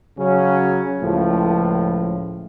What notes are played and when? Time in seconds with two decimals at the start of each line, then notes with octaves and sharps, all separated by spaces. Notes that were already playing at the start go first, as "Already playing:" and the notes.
0.18 C#3 F#3 C#4
1.02 C#2 A2 F3